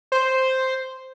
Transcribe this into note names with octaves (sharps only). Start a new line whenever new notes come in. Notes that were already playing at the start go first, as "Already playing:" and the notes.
C5